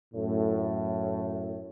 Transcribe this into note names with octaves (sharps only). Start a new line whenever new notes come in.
F#2 A2